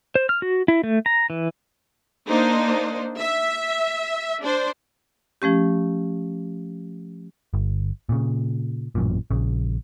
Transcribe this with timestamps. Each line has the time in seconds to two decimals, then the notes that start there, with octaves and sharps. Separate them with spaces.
0.15 C5
0.29 F6
0.42 F#4
0.68 E4
0.84 A3
1.06 A#5
1.30 E3
2.29 A#3 D4 D#4 C5
3.20 E5
4.43 D4 C5
5.42 F3 A3 C#4 G4
7.54 G1
8.09 A#2 C#3
8.95 A1 F#2 A#2
9.31 A#1 C#3